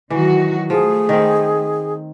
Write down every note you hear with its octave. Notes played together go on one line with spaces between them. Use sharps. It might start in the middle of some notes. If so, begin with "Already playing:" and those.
D#3 E3 F#3 F#4
F3 A3 G#4
D#3 C4